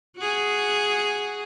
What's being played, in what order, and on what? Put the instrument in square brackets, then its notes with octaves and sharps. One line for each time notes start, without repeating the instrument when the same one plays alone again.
[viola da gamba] F#4 G#4